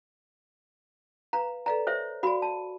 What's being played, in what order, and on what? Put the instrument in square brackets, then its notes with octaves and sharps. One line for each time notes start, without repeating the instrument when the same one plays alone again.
[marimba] B4 F5 [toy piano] A#5
[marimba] A4 B4 D5 [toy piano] A#5
[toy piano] C5 C#5 E5
[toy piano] F#4 B5 [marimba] D5 F5
[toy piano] A5